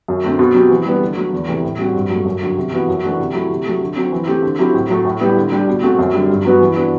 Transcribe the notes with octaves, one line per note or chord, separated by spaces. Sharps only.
F#2
D3 A3 C4
B2
F#3 C4 G4
E3
G3 B3 D4
D3
F#3 A3
E2
C3 E3 A3
A2
G3 C4 F#4
G2
F#3 A3
F#2
D3 F#3
C3
E3 B3 F#4
F#2
E3 A3 D4 F#4
C3
F#3 A3 E4
C3
F#3 A3
D3
F#3 C4
E3
A3 C4 G4
D3
F#3 C4 E4 G4
A2
F#3 A3
A2
G3 B3 E4 G4
D3
G3 D4 G4
B2
A3 C4 F#4
F#2
D3 G3
G2
F#3 B3 F#4
E3
B3 D4 F#4